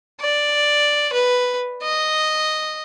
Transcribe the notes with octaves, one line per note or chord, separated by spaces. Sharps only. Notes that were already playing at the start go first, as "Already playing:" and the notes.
D5
B4
D#5